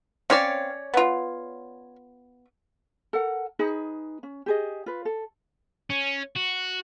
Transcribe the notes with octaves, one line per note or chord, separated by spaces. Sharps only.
C4 C#4 C#5 D5 F5
B3 F4
A4 A#4 F#5
D#4 G#4 B4
C#4
G4 G#4 D#5
F4 B4
A4
C#4
F#4